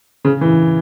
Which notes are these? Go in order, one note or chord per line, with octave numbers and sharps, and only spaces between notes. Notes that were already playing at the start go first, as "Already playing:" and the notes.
C#3
E3